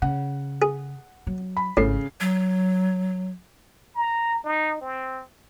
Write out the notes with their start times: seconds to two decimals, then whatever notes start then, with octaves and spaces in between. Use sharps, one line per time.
0.02 C#3 F#5
0.62 G#4
1.27 F#3
1.57 B5
1.77 G#1 A2 C#3 C7
2.21 F#3
3.95 A#5
4.44 D#4
4.81 C4